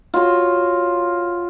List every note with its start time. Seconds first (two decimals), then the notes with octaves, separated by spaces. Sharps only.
0.14 F4 F#4 C#5 C6